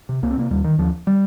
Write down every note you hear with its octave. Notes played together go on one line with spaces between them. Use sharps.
C3
C2 A#3
C4
C3 A#3
D#2 G3
D#3
D#2 F3
G3